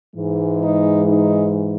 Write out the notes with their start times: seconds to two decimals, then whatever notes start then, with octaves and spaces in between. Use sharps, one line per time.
0.15 G#2 E3 G#3
0.62 D#4
1.08 D#4